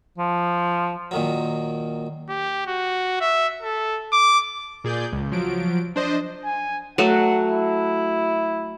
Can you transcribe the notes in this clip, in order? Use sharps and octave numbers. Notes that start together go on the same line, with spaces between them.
F3
A#2 D#3 F#3
G4
F#4
E5
A4
D6
A#2 G#4 D5 G6
C#2
F3 F#3 D7
D4 C5 D#5
G#5
F#3 A3 F#4 F#5
E4